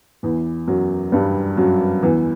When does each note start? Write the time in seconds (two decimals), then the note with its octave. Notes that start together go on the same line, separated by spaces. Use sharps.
0.23 E2 E3
0.68 F#2 F#3
1.12 G2 G3
1.57 F#2 F#3
2.03 E2 E3